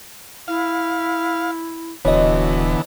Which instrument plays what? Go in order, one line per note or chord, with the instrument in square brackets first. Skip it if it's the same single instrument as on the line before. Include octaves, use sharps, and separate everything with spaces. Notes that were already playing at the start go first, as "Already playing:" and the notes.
[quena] E4 [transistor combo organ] F5
[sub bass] D#1 [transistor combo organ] D3 E3 B3 [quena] F#4 [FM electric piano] C#5 D#5